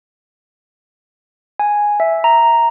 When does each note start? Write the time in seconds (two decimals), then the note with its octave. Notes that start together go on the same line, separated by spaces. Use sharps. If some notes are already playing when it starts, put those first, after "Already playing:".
1.59 G#5
2.00 E5
2.24 A#5